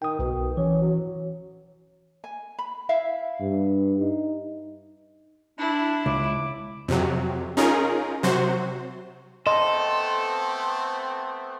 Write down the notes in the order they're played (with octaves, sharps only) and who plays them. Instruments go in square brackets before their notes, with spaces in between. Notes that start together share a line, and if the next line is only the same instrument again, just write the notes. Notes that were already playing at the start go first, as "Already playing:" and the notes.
[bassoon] D#3 [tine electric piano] G5 D#6
[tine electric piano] B1 [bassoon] B2
[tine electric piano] E3 [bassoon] C#4
[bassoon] F#3
[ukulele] G#5
B5
E4 E5 F5
[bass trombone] G2
D#4
[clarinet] D4 [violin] E4
[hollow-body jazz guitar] C#2 [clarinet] D6
[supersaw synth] F2 C3 F#3
C#4 D#4 F4 G#4 A#4
C3 F#3 F#4 C5
[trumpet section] A3 B3 C4 [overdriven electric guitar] A4 [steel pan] D#5 [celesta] C6